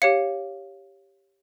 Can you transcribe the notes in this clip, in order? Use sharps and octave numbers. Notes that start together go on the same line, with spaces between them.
G4 C#5 F5 C#7